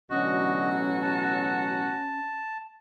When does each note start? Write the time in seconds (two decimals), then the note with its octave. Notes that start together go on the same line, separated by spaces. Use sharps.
0.11 A1 B2 D3 F#3 C#4 F#4 D#5 C#6
1.02 A5